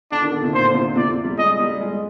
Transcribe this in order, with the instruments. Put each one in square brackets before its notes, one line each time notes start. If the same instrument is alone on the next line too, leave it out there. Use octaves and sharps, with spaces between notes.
[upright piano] D3 [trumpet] D4
[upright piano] D#3
D3
C3
[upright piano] A#2 [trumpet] C5
[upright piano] D3
C3
A#2
[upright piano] C3 [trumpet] D5
[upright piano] C3
G3
[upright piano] G#3 [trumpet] D#5
[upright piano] G3
G#3
G#3